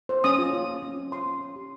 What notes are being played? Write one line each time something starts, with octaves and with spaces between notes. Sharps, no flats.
C5
C#4 D#6
F4
F4
C#4
C#4
C#4
F4 C6
C#4
C#4
G4